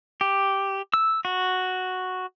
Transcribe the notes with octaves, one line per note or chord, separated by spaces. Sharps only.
G4
E6
F#4